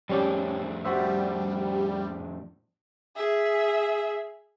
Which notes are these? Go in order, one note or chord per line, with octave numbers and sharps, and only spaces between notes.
F2 A2 G3 C#4 G4
G3 F#4 C5 E5
G#4 E5